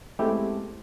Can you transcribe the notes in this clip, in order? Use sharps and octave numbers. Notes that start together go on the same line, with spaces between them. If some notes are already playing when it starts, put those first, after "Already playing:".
G#3 A3 B3 C4 E4 G4